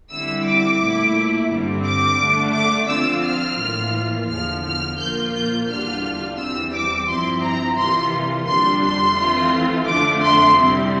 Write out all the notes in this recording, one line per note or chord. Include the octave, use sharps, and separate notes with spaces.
D3 G3 C4 E4 E6
D6
A#2 A3 E4
G2 D3 G3 C4
D6
D3 A3 D4
D6
D3 F3 C4 F4 E6
F6
A2 E3 A#3 F4
E2 D3 F3 F6
F6
A#2 F3 A#3 F4 G6
G6
E2 D3 G3 D4 F4 F6
E2 E3 G3 C4 E6
D6
G2 F3 C4 E4 C6
A#5
C3 E3 G3 A#3 F4 C6
F2 D3 G3 D4 C6
C6
E3 A3 C4 F4
F2 D3 F3 A3 D4 D6
C6
C3 G3 C4 E4